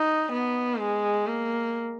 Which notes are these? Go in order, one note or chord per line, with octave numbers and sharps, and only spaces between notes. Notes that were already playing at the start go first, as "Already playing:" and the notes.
Already playing: D#4
B3
G#3
A#3